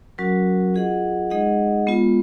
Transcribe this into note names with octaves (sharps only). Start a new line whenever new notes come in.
F#3 C#4 F#4 A#4
F4 G#4 D#5 F#5
G#3 D#4 G#4 D#5 F#5
G#3 B3 F4